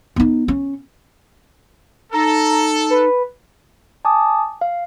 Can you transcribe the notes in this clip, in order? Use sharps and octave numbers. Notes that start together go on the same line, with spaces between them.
B3 D#4
C#4
D#4 A4 A#5
B4
G#5 A5 D6 D#6
F5